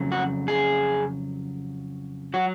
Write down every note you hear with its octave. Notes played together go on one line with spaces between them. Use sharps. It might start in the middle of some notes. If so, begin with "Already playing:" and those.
Already playing: F2 C#3 F#3
F#4
G#4
F#3 F#4